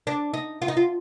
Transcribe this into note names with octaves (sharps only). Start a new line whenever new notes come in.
D4
D#4
F4
D#4
F4